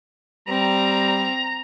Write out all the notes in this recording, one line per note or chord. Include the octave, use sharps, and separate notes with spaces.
G3 C4 A#5